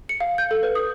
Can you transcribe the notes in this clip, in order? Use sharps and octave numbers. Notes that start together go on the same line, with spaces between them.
C#7
F5
G6
A4
B4
D#6